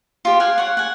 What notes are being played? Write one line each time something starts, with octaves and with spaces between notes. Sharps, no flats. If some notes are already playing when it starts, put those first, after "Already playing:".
F4 G4
F5 F#5 G#5
C#5 F#5
F#5 G#5